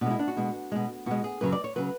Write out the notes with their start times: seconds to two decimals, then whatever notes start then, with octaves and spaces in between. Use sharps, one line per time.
0.01 B2 D4
0.06 G#3 E4
0.19 D4
0.28 F#4
0.37 B2 G#3
0.72 B2 G#3
1.06 B2 G#3 F#4
1.24 G#4
1.41 F#2 C#3 F#3 B4
1.52 D5
1.64 C#5
1.76 C#3 F#3 B4